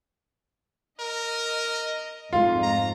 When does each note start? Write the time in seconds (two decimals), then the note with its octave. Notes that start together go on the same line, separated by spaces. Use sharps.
1.00 A#4 D#5
2.33 F2 G#2 F4
2.62 A#5